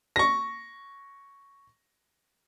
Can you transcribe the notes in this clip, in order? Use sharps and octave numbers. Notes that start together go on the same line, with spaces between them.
C#6 A#6